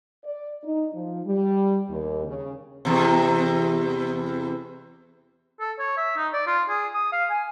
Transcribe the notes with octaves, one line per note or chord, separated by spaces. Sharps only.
D5
D#4
F3
G3
D#2
C#3
E2 C3
A4
C#5
E5
D#4
D5
F4
G#4
D#6
F5
G#5